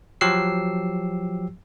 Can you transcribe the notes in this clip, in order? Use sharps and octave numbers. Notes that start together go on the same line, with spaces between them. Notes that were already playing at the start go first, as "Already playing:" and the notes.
F3 F#3 G4 E6 C7